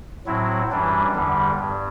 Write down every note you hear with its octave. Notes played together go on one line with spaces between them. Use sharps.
A2 F#3 C4 E4
F#2 E3 G3 D4
E2 D3 G3
G2